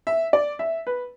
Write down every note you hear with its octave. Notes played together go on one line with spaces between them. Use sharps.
E5
D5
E5
B4